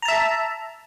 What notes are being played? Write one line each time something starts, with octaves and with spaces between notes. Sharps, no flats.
E5 A5 A#5